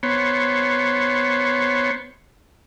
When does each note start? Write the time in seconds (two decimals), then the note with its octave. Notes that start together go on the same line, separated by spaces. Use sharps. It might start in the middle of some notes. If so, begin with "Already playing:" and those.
0.03 B3 C5 C#5